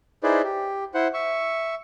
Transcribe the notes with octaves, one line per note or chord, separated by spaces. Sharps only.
D#4 E4 G#4 B4 C5 D5
G4
E4 C5 F#5
E5 C#6